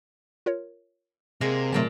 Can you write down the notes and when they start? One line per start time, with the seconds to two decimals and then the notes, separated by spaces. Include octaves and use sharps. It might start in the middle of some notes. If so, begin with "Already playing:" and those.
0.46 F4 A#4 C#5
1.41 C3 G#3 A#3 E7
1.73 A#2 D3 F#3 A3 G5 A5